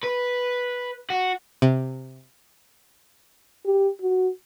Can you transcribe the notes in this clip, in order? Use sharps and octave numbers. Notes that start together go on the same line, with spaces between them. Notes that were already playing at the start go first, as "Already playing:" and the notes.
B4
F#4
C3
G4
F#4